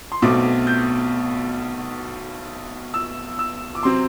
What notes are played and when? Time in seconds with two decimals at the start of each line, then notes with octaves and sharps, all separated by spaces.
0.12 C6
0.22 B1 B2 A3 C4 D6
0.67 G6
2.94 E6
3.39 E6
3.75 D6
3.83 C3 F#3 C4 C6